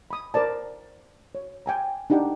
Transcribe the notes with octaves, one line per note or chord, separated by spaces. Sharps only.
B5 D#6
A#4 C5 D5 A5
C#5
G5 G#5 A#5
D4 D#4 G4 F#5 G5